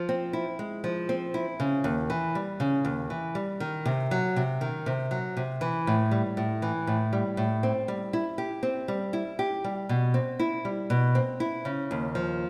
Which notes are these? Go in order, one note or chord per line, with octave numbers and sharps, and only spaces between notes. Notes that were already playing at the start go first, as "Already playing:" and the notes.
Already playing: F3
C4
E4
G#3
F3
C4
E4
C#3
D#2
E3
G3
C#3
D#2
E3
G3
D#3
C3
F#3
C3
D#3
C3
F#3
C3
E3
A2
G3
A2
E3
A2
G3
A2
C4
G3
E4
G4
C4
G3
E4
G4
G3
B2
C4
E4
G3
B2
C4
E4
C#3
D#2
F3